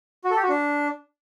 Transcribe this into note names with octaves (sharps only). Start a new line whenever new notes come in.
F#4
A4
G4
F#4
D4